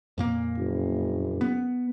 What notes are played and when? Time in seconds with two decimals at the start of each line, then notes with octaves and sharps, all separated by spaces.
0.18 F2 A#2 A#3
0.58 F#1
1.41 B3